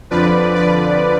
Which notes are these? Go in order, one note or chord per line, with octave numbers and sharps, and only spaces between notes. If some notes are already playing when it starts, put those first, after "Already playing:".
F2 D3 F3 B4 D5
B4 D5